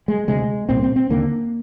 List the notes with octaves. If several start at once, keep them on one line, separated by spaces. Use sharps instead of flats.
G#3
D2 C3 G#3
C2 A#2 C4
C4
C4
D#2 D3 A#3